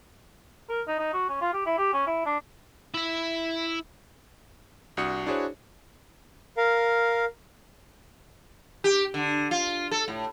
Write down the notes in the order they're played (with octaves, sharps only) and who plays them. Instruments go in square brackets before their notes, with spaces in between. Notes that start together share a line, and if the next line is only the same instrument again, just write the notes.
[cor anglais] A#4
D#4
D#4
F#4
C#4
F4
G4
E4
G4
C#4
E4
D4
[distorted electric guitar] E4 E5
[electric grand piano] C2 D4 F#4 D#6 C#7
D4 E4 F#4 G#4 C5 C#5
[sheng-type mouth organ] A#4 F5
[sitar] G4
D3
F4
A4
A2